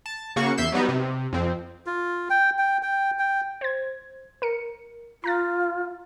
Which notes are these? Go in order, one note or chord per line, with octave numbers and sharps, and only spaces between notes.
A5
C#3 A#3 F#4 C#6
E2 E5 G6 C7 E7
F#3 G3 B3 D#4
C3
F2 C4
F4
G5
G5
G5
G5
C5 G#6
A#4 C#7
F4 A#5 F#6 A6